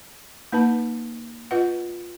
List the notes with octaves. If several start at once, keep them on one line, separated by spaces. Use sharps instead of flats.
A#3 D#4 B4 A5
F4 B4 D#5 F#5